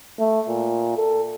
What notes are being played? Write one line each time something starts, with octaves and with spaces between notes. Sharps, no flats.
A3
A#2
A4